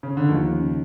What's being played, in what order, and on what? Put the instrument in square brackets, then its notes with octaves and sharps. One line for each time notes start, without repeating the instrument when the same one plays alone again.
[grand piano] C#3
D3
[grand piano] D#2 D#3 [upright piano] F3
[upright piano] C#3